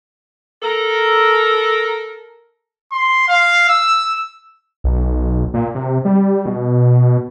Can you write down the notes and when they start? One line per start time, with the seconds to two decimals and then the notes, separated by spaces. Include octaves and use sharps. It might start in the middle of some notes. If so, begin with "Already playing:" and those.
0.63 A4 A#4
2.92 C6
3.28 F5
3.69 E6
4.84 B1
5.54 A#2
5.75 C3
6.05 G3
6.46 B2